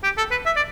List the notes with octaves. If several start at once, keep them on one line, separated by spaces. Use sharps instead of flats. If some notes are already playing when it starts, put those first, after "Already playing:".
G4
A4
B4
E5
D5